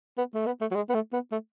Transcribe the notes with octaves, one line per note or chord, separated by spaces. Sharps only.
B3
A3
B3
A3
F#3
G#3
B3
A3
B3
A3